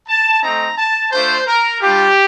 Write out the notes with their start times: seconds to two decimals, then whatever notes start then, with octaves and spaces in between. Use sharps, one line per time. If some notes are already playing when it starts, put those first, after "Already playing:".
0.08 A5
0.43 A3 C4 D#4 A#5
0.78 A5
1.11 A3 D4 F4 C5
1.46 A#4
1.81 G3 D4 F4 G4